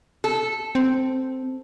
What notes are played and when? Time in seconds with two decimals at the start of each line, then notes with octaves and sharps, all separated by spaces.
0.24 A4
0.75 C4